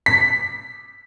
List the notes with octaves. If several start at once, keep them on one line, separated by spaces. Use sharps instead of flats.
B6